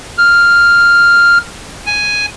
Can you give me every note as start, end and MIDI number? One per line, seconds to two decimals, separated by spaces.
0.18 1.38 89
1.86 2.26 80